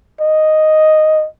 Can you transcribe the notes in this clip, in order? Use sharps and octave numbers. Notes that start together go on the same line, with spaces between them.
D#5